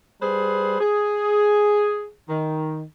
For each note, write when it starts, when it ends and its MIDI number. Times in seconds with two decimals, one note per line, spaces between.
0.21 0.80 55
0.21 0.80 68
0.21 0.80 71
0.21 0.80 72
0.80 2.10 68
2.29 2.84 51